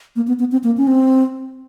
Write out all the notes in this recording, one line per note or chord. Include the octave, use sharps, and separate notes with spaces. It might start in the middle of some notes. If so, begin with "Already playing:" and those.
A#3
B3
B3
C4
A#3
C#4
C4